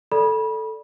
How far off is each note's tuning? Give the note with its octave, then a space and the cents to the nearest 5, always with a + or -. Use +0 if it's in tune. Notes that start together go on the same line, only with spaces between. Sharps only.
A4 +0 D5 +5 B5 -30